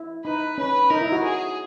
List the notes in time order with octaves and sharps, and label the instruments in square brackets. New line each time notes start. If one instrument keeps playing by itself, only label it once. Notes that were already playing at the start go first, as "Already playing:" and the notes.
Already playing: [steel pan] E4
[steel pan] D#4 [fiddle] B4
[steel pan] C#4 [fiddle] B4
[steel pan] D#4 [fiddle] A#4
[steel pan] E4
F#4
[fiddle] G#4